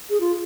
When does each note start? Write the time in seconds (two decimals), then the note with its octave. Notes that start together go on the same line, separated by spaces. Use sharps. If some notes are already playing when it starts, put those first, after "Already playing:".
0.10 G#4
0.20 F4